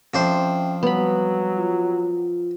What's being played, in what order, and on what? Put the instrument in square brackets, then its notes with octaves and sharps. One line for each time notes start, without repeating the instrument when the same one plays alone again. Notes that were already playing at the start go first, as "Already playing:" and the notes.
[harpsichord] F2 D4 C5 [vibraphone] C#4 E5 G5
[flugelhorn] F#3 [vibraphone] G3 [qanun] B3 B5
[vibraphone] F4